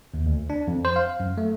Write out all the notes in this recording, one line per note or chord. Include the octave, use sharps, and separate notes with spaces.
D#2
D2
D4
F2
C5
F5
F#2
A3